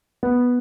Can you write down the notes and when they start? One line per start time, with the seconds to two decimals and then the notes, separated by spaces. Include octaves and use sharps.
0.23 B3